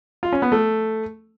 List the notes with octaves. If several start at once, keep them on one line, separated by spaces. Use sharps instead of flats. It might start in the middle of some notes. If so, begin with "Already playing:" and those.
F4
C#4
B3
A3